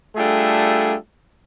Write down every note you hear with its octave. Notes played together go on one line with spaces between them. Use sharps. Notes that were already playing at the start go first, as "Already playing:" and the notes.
G3 A3 D4 F4 G#4 A4